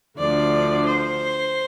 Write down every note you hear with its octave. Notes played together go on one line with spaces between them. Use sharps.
D2 D3 F3 D5
C5